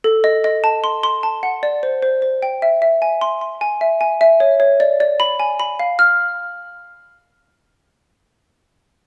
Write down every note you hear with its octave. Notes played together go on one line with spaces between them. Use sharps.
A4
D#5
D#5
A5
C6
C6
A5
F#5
D5
C5
C5
C5
G5
E5
E5
G#5
C6
C6
G#5
E5
G#5
E5
C#5
C#5
D5
D5
B5
G#5
B5
F5
F6